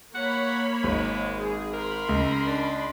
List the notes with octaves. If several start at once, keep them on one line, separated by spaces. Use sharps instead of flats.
A#3 C#5 F#5 B5
G#1 G#3
G#4
A#4 B5 C6
C#2
D4